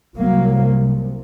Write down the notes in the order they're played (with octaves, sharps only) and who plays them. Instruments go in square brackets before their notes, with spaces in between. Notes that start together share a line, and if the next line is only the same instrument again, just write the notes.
[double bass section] C2 C3 F#3 A#3